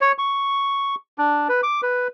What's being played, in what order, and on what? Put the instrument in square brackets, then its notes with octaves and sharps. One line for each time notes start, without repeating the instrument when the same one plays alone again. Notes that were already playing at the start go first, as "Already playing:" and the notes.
[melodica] C#5
C#6
D4
B4
D6
B4